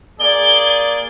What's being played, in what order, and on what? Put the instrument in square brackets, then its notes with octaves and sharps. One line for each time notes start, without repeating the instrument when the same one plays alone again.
[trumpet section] A#3 G#4 D5 [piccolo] G7